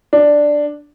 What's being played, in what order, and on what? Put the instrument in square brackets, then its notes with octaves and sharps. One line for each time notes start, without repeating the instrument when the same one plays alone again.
[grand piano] D4